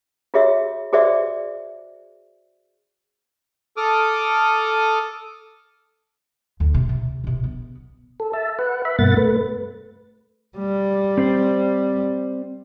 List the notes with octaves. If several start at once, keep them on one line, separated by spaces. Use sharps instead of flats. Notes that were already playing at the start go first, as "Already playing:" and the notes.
F4 F#4 G#4 C#5 E5
F#4 G#4 C5 D5 E5
A4 D6 D#6 F6
D2
C3 A#3
C3
C3 E3
B3
A4
E5 A5
B4 F#5
E5 B5
G2 B2 A#3 F#5 A6
A3 B4
G3
C4 C5 D5